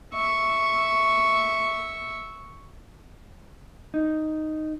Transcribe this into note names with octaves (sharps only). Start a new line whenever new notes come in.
E5 C#6
D#4